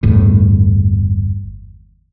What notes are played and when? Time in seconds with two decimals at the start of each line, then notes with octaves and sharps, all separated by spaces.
0.03 G1 E2 A2